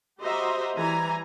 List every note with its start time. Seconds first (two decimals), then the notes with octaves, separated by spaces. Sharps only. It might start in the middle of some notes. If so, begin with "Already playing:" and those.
0.21 F#4 G4 C5 D#5 E5 A#5
0.76 E3 G3 G#5 A#5